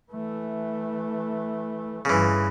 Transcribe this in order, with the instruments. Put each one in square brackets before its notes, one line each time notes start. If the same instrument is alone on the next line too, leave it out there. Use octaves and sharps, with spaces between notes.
[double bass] E3 A3
[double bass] G1 G2 [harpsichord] C#3 E3